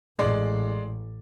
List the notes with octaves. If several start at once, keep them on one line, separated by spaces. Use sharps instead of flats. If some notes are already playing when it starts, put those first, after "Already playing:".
A1 G#3 D5 C6